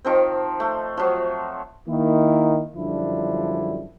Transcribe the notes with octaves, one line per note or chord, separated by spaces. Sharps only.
D#3 F3 C4
A3
F3 F#3
D#3 A#3 E4
F#2 D3 F3 G3 D4 E4